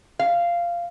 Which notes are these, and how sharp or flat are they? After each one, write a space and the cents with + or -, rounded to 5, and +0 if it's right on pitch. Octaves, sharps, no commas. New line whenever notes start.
F5 -15